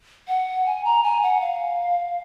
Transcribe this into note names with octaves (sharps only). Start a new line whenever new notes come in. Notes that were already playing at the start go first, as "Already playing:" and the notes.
F#5
G#5
A#5
G#5
F#5
F5